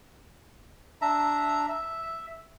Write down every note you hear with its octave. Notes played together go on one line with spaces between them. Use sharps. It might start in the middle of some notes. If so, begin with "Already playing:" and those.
D4 E5 A#5
E5